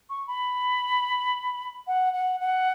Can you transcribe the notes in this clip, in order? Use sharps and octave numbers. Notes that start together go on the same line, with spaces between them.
C#6
B5
F#5
F#5
F#5